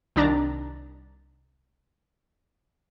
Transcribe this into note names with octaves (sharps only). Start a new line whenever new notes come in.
C2 D#3 D4 A#5 A6